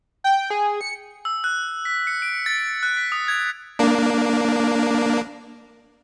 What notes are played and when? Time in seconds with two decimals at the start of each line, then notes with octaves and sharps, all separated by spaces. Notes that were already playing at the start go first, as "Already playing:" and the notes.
0.24 G5
0.50 G#4
0.81 C#7
1.25 E6
1.44 F#6
1.85 B6
2.07 C#7
2.22 D7
2.46 A6
2.83 F#6
2.97 B6
3.12 D#6
3.28 G#6
3.79 A#3 D4